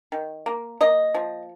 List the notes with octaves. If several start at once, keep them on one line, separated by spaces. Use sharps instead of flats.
D#3
A#3
A#3 D#5
F3